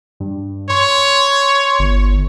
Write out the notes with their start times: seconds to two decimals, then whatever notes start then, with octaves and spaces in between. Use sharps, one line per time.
0.20 G2
0.70 C#5 C6
1.79 G1